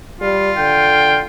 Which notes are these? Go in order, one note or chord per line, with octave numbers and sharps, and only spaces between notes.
G3 F4
D3 G5